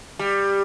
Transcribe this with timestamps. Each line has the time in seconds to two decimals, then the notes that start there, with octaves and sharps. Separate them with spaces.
0.19 G3